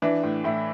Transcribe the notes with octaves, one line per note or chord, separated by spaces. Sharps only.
E3 D4
A2
A2 E4